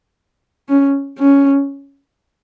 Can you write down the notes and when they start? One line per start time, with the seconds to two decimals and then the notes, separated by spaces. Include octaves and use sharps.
0.69 C#4
1.19 C#4